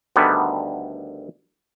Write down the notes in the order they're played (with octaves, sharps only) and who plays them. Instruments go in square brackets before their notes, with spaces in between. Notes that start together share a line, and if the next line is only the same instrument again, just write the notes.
[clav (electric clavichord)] D2 D3 D#3 G3 B3